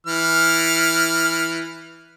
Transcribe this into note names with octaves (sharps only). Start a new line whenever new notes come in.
E3 F6